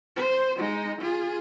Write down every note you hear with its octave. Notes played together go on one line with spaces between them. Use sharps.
C5
G#3 D#4
F4 G#4